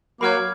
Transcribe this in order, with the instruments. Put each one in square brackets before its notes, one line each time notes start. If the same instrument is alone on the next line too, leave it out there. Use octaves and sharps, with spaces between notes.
[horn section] F#3 A#3 [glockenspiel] B5 D6 F6 G#6